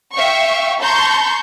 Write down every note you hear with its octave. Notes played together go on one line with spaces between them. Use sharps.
E5 F5 G5 C#6
A5 A#5 C6 C#6 G6